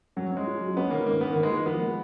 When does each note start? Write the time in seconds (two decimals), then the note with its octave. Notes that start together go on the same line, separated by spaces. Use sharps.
0.16 F#3 C#4
0.32 G#3 C#4
0.47 F4
0.61 F#3
0.77 B3 C#4
0.91 D#3 A#3
1.06 G#2 A#3
1.21 D#3 B3
1.33 D#3 A#3
1.43 G#3
1.51 A#3 F4
1.66 F3 B3
1.81 G#3